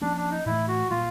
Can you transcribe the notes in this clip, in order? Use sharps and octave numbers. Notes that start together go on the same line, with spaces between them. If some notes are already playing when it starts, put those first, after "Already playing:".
F3 A#3 C#4 D4
D4
D#4
A2 E3 A3 E4
F#4
A#2 G3 A#3 F4